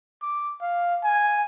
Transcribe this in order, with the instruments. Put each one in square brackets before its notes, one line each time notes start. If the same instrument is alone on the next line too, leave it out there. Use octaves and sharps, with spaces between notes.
[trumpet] D6
F5
G#5